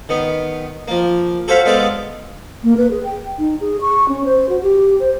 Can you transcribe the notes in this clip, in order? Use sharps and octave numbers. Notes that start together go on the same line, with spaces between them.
D#3 B3
F3 A#3
F#4 A4 C5 C#5 F5 B5
G#3 B3 A4 C5 D5 F5
A#3
B4
G#4
G5
D#4
G#4
C#6
C#4
C5
F#4
G4
C5